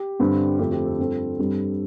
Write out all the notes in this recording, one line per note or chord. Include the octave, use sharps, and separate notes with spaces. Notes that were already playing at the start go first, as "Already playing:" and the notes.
Already playing: G4
G2 D3 G3 C4
F2 D3 A3 C4 G4
G4
A4
G2 F3 C4
G2 G3 C4